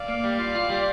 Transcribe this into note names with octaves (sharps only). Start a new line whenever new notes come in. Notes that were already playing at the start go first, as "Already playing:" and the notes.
Already playing: D5 F5
A#3
G3
F4
F4
G3